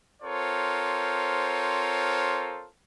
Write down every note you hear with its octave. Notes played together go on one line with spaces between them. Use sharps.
C4 F4 A4 A#4 C5 C#5